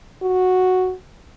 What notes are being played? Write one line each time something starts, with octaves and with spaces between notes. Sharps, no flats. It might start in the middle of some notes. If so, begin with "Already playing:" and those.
F#4